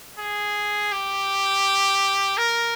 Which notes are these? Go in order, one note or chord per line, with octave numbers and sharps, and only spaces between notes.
G#4
G4
A#4